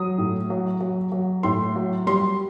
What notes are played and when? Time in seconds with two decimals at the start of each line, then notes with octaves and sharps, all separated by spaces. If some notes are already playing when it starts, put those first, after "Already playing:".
Already playing: F#3 D#6
0.18 A2
0.50 F#3
0.81 F#3
1.12 F#3
1.43 A2 C6
1.76 F#3
2.07 G3 C6